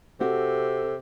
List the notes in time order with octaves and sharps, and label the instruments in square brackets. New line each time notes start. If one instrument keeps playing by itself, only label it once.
[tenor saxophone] C3 [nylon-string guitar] C4 F#4 [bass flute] A4